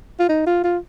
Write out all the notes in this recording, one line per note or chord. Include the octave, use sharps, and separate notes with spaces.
F4
D#4
F4
F4